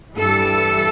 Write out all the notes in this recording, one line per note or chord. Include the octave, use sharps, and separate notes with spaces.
G2 E3 G3 A4